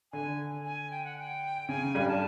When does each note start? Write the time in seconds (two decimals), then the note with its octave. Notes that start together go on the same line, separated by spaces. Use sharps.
0.12 D3 G#5
0.65 G#5
0.91 G5
1.05 F#5
1.18 G5
1.69 C#3 G#5
1.95 G2 G3
2.08 A5